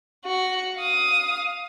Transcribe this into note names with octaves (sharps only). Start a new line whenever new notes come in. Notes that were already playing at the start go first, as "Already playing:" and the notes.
F#4
F5 D#6